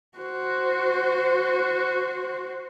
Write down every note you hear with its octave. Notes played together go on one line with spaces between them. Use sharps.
F#4 C5